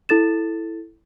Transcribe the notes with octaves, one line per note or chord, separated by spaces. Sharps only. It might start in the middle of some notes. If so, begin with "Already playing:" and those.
E4 A4 A6 E7